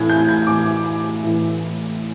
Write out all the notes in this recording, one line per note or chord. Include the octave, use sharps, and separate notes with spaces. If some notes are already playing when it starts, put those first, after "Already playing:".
Already playing: A2 E3 G#6
G6
G#6
A2 E3 D6
A2 E3